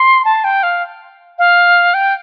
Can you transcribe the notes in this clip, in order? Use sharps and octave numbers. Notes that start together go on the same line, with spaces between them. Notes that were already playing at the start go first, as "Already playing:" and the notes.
Already playing: C6
A5
G5
F5
F5
G5